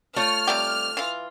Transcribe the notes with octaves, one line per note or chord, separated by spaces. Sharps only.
A3 F4 C#5 F6
C3 G3 G4
E3 F4